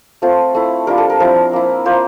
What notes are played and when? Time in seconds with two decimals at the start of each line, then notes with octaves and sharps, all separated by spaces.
0.22 A3 C4 F4 C5
0.55 A3 E4
0.87 G3 D4 F4 A#4
0.98 A4
1.10 A#4
1.20 F3 C4 E4 A#4
1.53 A#3 E4
1.86 A#3 F4 C5